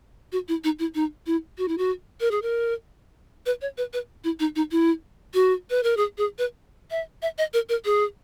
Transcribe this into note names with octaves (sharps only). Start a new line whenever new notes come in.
F#4
E4
D#4
E4
D#4
E4
F#4
E4
F#4
A#4
G#4
A#4
B4
C#5
B4
B4
E4
D#4
D#4
E4
F#4
B4
A#4
G#4
G#4
B4
E5
E5
D#5
A#4
A#4
G#4